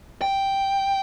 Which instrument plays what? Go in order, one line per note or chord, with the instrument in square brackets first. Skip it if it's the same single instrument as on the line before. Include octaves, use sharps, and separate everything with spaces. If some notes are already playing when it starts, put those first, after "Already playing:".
[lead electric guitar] G5